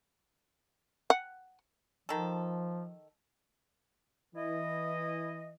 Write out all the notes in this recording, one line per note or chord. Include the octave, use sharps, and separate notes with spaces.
F#5
D#3 F3 A4
E3 E4 D#5